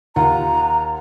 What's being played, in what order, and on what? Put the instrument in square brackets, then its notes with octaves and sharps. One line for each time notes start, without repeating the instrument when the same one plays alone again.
[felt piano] D#2 F4 F#5 [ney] A#5